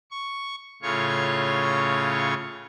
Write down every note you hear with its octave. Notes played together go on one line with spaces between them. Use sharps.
C#6
A2 C#3 F4 C#5 C#6